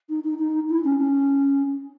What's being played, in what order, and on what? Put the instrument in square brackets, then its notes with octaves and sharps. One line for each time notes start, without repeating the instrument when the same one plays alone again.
[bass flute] D#4
D#4
D#4
E4
C#4
C#4